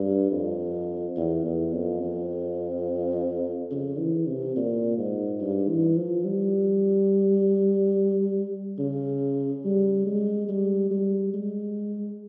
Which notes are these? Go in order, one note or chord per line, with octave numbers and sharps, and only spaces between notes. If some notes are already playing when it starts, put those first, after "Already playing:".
Already playing: G2
F2
E2
E2
F2
F2
C#3
E3
C3
A#2
G#2
G2
E3
F3
G3
C#3
G3
G#3
G3
G3
G#3